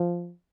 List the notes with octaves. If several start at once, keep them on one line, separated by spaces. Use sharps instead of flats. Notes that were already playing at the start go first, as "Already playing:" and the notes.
Already playing: F3